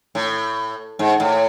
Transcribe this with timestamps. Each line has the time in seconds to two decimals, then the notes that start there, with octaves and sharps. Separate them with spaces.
0.15 A2
0.99 G#2
1.20 A2